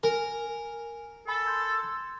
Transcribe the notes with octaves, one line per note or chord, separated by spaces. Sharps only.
A#4 G#5
A4 G#5 B5
C6 G6 G#6